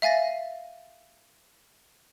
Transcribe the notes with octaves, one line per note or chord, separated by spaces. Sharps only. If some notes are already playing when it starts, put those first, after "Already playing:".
E5 F5 G#5 A6 A#6